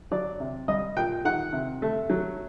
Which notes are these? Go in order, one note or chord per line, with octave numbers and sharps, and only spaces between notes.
F#3 D5
C3
G3 D#5
A#2 G5
D#3 F#5
C3
A3
F#3